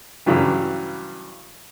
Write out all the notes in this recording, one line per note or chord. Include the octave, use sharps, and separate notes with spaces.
G2 C#3 E3 F#3 G3